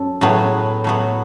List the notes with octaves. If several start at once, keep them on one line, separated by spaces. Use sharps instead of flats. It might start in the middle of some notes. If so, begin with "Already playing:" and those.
Already playing: F#2 A4
A2 F#3 B3
A2 F#3 B3